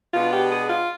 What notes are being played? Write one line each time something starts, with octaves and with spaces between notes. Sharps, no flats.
B2 G#3 B3 D4 F4
G4
G#4
F4